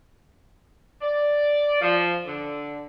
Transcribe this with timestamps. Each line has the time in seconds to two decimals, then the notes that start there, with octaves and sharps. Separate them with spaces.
1.01 D5
1.81 F3
2.26 D3